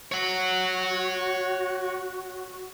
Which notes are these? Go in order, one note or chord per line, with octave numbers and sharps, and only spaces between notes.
F#4 C#5 F#5